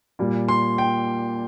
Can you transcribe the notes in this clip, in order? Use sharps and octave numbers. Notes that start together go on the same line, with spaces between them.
A#2 G3
C6
G5